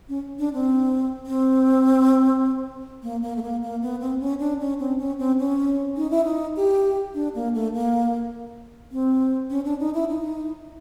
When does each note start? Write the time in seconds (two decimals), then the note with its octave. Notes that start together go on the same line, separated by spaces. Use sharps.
0.09 C#4
0.39 D4
0.54 C4
1.26 C4
3.03 A#3
3.22 A#3
3.36 A3
3.42 A#3
3.62 A#3
3.82 B3
4.01 C4
4.20 C#4
4.40 D4
4.60 C#4
4.79 C4
4.99 C#4
5.19 C4
5.39 C#4
5.97 D#4
6.10 E4
6.25 D#4
6.56 G4
7.14 D4
7.35 A#3
7.54 A3
7.74 A#3
8.92 C4
9.50 C#4
9.65 D4
9.80 D#4
9.94 E4
10.09 D#4